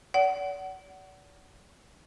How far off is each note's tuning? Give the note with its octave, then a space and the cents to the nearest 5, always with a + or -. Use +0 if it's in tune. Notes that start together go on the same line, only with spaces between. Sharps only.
D5 -40 F#5 +25